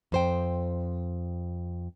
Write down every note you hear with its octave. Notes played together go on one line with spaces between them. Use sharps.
F2 C5 G5